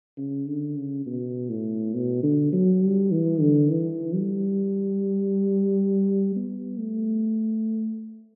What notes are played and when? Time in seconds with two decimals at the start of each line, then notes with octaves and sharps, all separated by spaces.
0.18 C#3
0.47 D3
0.77 C#3
1.06 B2
1.50 A2
1.94 B2
2.23 D3
2.53 F#3
2.82 G3
3.11 E3
3.41 D3
3.71 E3
4.15 G3
6.36 B3
6.79 A3